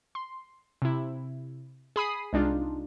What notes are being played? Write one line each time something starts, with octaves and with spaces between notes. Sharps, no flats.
C6
C3 E4
G#4 B5 D#6 C7
C2 G#3 D4 D#4 F4